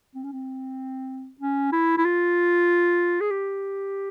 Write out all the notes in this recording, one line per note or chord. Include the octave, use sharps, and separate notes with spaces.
C4
C#4
C4
C#4
E4
E4
F4
G#4
G4